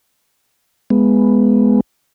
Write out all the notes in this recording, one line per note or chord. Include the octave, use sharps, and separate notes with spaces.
G#3 B3